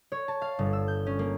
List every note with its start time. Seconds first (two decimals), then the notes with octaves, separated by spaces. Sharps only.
0.12 C#5
0.28 A5
0.42 F5
0.59 G1
0.73 E6
0.88 G6
1.07 C#4
1.19 A#3